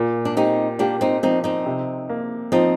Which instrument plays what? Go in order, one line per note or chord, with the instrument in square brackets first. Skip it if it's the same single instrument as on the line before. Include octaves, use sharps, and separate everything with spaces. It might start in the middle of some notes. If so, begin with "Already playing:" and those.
Already playing: [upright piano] A#2
[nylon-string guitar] D4
[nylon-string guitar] C4 D#4 [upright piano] G4
[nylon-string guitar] A#3 D4 [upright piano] G4
[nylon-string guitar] C4 D#4
[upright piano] F3 [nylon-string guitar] C4 D#4
[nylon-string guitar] C4 D#4
[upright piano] C3
A#3
[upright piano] F3 [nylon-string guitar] C4 D#4